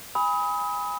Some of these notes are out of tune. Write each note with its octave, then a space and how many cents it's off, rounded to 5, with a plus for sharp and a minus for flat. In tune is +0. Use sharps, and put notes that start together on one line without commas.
G#5 -25 B5 +0 D#6 +35